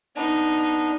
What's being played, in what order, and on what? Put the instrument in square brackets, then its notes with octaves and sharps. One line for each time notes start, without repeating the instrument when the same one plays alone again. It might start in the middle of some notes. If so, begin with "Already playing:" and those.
[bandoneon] B3 D4 [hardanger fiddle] D#4